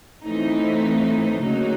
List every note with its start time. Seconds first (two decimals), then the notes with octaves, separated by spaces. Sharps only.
0.25 A2 E3 A3 C4 D#4
1.44 D2 C#3 F#3 A#3 D#4